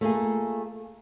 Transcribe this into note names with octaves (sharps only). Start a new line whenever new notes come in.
A3 A#3 F4 G#4